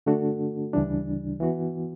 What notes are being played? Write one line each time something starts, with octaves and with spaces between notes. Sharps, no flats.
D3 A3 D4 F#4 A4
D2 C#3 E3 G3 D4
E3 B3 F#4